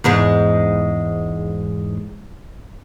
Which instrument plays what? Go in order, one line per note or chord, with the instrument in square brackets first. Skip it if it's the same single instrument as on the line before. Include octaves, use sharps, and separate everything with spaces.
[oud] E2 G#2 G#3